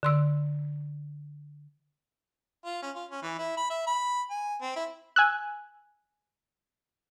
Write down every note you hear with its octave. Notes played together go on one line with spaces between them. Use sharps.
D3 C6 E6
F4
C#4
F4
C#4
E3
E4
B5
E5
B5
G#5
C4
E4
G#5 E6 F#6